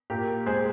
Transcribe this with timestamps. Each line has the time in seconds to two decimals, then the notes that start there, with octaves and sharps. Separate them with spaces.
0.10 A#2 G4 A#4
0.46 G#3 G#4 C5